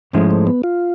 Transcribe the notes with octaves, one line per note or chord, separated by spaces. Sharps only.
G#2 F3 G#3 A3 C#4 E4
A3
B3
F4